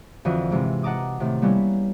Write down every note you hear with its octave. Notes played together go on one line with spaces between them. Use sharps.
F2 D3 E3 F#4 D#5
G#2 C3 E3
D#5 F#5 A5 A#5 D6 D#6
A2 C3 D#3
G3 A#3 B3 C#4 E4